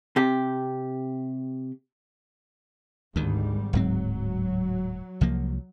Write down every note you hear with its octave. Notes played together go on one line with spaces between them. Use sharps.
C3 G4
G#1 D2 G#2 D#3 G3
D1 G#2 F#3 C4
C2 F3 A#3